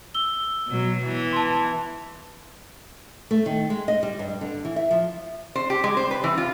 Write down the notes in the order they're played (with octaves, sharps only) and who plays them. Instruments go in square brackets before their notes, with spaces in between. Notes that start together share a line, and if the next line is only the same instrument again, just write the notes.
[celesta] E6 G7
[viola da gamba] B2 F#3
E3 B3
[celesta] A5 C6
[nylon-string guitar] A3
D#3
G#3
D#5
G3
G2
D3
E3
E5
F3
[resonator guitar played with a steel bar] C5
G4
G#3
C5
B4
E3
F4